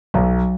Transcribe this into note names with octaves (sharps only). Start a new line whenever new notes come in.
B1 F#3